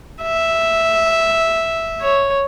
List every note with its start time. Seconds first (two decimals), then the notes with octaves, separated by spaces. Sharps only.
0.23 E5
2.02 C#5